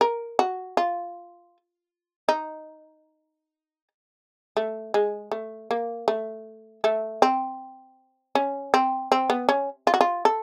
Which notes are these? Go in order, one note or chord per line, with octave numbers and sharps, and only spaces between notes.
A#4
F#4
F4
D#4
A3
G#3
A3
A#3
A3
A3
C4
C#4
C4
C4
B3
C#4
F4
F#4
F4
A4